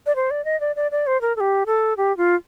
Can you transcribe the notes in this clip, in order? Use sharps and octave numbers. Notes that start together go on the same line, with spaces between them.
D5
C5
D5
D#5
D5
D5
D5
C5
A#4
A4
G4
A4
G4
F4